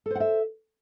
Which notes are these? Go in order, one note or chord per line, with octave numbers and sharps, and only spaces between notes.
A4 C5 E5 F#5